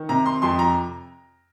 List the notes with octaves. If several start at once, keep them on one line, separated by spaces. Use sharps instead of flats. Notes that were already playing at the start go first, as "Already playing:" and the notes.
Already playing: D#3
C3 A#5
C6
F2 C6
A#5